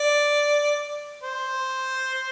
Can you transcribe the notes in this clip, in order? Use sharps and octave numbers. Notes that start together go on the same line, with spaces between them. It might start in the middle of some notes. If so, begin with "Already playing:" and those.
Already playing: D5
C5